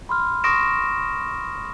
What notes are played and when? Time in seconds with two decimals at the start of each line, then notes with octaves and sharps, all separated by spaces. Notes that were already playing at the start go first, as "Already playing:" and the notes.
0.09 B5 C6 F6
0.44 C6 C#6 D#6 A#6 D7 E7